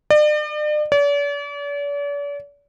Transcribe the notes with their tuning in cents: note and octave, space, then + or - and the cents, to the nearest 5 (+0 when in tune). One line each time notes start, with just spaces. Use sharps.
D5 +40
D5 -45